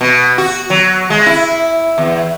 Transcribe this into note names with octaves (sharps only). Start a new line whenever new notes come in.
B2
F#4
F#3
G#3
E4
E2